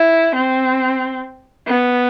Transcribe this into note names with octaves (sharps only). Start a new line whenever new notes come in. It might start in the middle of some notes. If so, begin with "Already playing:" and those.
Already playing: E4
C4
B3